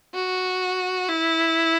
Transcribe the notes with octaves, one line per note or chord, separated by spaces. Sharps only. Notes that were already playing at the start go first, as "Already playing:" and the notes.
F#4
E4